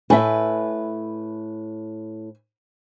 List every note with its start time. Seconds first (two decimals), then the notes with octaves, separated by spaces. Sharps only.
0.10 A2 B4 E5 G#5